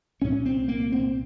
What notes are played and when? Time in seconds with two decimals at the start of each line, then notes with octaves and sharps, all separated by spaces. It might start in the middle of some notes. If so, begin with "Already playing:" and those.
0.21 C2 A#2 C#4
0.46 C4
0.68 A#3
0.92 C4